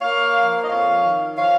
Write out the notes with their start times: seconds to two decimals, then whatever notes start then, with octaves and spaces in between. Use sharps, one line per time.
0.02 A#3 C#5 F5
0.36 F3
0.65 D#5
0.69 F2 C#5 F5
1.05 D#3
1.37 F3 C#5 F5